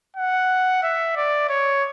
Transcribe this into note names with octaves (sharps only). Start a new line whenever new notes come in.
F#5
E5
D5
C#5